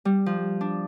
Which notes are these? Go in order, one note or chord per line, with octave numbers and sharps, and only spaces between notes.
G3
F3
D4